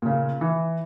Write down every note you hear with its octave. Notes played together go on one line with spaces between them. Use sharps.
A#2 C#3
E3